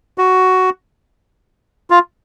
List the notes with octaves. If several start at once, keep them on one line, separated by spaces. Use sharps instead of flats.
F#4
F4